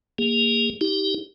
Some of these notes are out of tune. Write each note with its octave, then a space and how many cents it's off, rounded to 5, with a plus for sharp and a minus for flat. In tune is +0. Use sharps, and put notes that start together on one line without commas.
A#3 +0 G#4 -30
D#4 +40 G4 +0